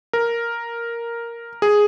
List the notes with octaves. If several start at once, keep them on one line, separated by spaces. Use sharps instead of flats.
A#4
G#4